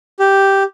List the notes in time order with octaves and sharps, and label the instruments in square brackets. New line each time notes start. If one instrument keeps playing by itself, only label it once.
[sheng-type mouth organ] G4